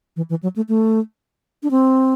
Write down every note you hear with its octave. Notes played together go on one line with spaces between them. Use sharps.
E3
E3
F#3
A3
A3
D4
C4